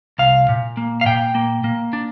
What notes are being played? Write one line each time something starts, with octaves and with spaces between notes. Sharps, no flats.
C2 F5
A#2
A#3
F5
A#2 G5
A#3
A#3
D4